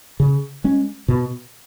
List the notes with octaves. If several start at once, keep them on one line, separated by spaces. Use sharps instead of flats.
C#3
G#3 C#4
B2